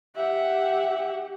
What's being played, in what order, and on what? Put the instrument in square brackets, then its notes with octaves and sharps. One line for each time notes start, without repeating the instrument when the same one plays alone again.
[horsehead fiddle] G4 [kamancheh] E5 F#5